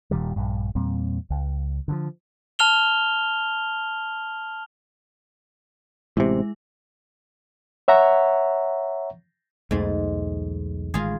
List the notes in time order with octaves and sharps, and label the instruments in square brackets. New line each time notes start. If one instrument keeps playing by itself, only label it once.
[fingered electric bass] D#1 A#2 D#3 G3
A#1 G2
E2 A#2 G3 C4
C#2
D3 D#3 F3
[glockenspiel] A5 F6 F7 G7
[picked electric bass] A1 C3 [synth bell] G#3 E4
[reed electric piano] C#5 E5 F#5 A#5 C#6
[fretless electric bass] B1 E2 A3 [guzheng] G#2 G#3
[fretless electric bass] A1 D#3 G#3 [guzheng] F4 G#4